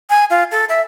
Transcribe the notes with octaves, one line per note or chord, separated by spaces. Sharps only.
G#5
F4
A4
E5